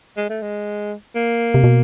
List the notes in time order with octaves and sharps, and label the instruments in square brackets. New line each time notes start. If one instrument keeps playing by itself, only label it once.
[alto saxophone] G#3
A3
G#3
A#3
[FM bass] C3
B2